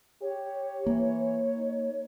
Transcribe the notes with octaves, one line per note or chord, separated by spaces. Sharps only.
G4 C#5
E3 A#3
D#4